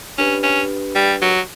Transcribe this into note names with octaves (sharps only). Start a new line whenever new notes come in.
C#4 D4 G4 B4
C#4
G3
F#3